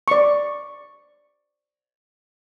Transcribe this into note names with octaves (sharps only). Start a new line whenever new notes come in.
D5 C#6